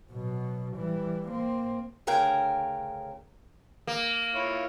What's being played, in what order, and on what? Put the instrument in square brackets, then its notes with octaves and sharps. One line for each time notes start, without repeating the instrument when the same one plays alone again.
[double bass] B2 F#3
E3 G3
A#3 C4
[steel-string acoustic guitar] D2 C#3 A#4 G5 G#5
[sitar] A#3
[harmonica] E4 F4 C#5